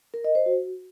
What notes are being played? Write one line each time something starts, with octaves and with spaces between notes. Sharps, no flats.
A#4
D#5
C5
F#4